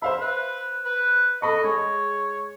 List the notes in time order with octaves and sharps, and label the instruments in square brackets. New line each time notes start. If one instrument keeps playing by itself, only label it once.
[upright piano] C5 F5 B5 [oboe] E5
[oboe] B4
B4
[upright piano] A4 B5 C#6 [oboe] D#5
[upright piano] G#3 G#4 [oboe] C#5